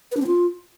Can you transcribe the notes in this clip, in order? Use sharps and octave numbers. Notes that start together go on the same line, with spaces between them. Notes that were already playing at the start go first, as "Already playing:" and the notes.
B4
D4
C4
F4